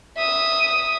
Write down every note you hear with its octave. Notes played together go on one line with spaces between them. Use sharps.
E5 D#6